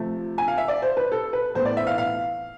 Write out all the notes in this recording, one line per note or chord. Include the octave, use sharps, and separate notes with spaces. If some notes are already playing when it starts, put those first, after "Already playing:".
Already playing: C3 F3 A3
G#5
F5
E5
D5
C5
B4
A4
B4
A2 E3 B3 C5
D5
E5
F5
F5